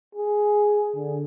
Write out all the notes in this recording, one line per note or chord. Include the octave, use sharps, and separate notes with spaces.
G#4
D3